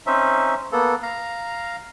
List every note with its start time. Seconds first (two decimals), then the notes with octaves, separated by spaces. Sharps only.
0.06 C4 C#4 D#4 E5
0.72 A#3 B3 A4
1.03 F5 A#5